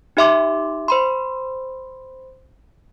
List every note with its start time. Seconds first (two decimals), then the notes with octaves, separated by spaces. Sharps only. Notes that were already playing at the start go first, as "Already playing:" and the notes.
0.17 D#4 G4 E5 C6 D6
0.88 C5 B5 C6